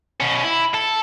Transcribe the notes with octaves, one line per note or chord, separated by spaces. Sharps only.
B2 C#4
E4
A4